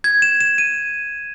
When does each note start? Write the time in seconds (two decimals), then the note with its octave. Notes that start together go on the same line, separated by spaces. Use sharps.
0.04 G#6
0.22 E7
0.41 E7
0.58 D#7